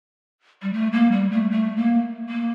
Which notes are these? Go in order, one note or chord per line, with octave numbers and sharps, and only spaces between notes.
G3
A3
A#3
G3
A3
A3
A#3
A#3